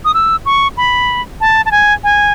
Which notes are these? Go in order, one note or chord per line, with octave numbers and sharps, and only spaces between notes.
D#6
E6
C#6
B5
A5
A5
G#5
G#5